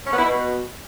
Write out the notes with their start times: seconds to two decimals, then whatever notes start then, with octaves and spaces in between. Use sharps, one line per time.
0.07 C#4
0.13 B3
0.19 E4
0.25 B2